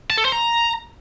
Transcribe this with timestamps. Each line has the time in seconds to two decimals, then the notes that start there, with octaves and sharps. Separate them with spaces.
0.10 A5
0.18 A4
0.25 C5
0.32 A#5